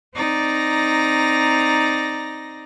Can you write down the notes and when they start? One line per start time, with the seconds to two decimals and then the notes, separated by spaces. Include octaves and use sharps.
0.13 C4 D#4 D5 A#5 A#6